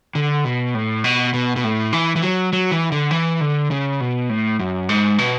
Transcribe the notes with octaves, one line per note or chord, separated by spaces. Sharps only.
D3
B2
A2
B2
B2
B2
A2
E3
E3
F#3
F#3
E3
D3
E3
D3
C#3
B2
A2
F#2
G#2
B2